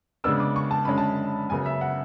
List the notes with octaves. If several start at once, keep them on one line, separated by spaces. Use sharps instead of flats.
C#3 G#3 B3 D4 E6
D6
C#6
A5
F#2 D3 G#3 C#4 B5
A5
F#2 C#3 F#3 B3 G#5
E5
F#5